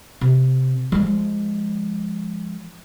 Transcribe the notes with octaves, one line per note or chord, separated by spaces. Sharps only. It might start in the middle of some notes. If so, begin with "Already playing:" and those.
C3
F3 G#3